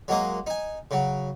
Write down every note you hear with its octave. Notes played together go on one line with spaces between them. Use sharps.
F#3 G#3 A#3 D#5
D#4 G#5
C#3 F#3